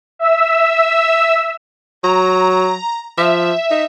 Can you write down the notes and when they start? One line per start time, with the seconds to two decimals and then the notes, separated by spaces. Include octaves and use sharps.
0.19 E5 E6
2.04 F#3 A#5
3.18 F3 E5
3.71 D#4